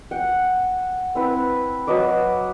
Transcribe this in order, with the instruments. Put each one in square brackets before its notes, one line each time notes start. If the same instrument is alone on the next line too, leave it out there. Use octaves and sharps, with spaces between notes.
[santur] F#5 G5
C4 E4 B4
F#3 B4 D#5 D6